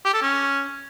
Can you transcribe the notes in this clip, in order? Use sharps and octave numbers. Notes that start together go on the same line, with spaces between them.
G4
A4
C#4